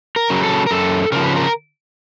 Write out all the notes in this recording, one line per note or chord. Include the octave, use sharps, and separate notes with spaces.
A#4
C#3 F#3
A4
A#4
F#2 A4
C#3 F3 A#4
B4
A#4